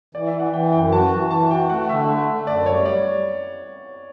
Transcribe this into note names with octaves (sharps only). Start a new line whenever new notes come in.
E3 D5
E5
E3
F#5
E3 G5
F#2 G5
F#4 A5
E3
E3 A5
F#4 G5
A3 F#5
D3 E5
A3
A3
F#2 D5
G3 C#5
D5